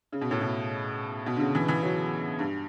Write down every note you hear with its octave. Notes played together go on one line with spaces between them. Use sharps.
C#3
B2
A2
B2
B2
D3
C#3
E3
E3
F#3
G2